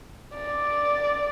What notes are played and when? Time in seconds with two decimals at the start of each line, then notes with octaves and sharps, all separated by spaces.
0.34 D5